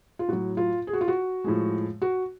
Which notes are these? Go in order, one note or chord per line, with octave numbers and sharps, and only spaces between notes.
F4
A2 F#3 F#4
F4
G#4
F#4
F4
F#4
A2 F3 G#3
F#4